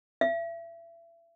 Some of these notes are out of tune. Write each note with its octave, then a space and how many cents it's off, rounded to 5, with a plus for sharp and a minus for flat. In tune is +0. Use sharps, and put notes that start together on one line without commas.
E5 +35